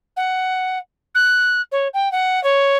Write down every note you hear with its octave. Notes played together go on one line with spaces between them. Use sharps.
F#5
F#6
C#5
G5
F#5
C#5